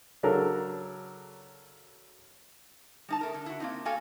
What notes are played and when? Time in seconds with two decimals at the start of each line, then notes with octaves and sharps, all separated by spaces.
0.23 C#3 F#3 D4 A4 A#4
3.08 G3 D#4 A5
3.21 A3 A#4
3.34 D3
3.46 E4 F#4
3.60 A#3 C4 D#4
3.85 A#3 F#4 A4 F5 G5 G#5